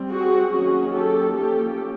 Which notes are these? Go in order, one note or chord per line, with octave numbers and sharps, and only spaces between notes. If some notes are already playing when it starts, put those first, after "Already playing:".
Already playing: G3 C4
F#4 G#4
D#3 F#3 A#3 C#4 F#4 G#4
G4 A4
F3 A#3 C#4 G4 A4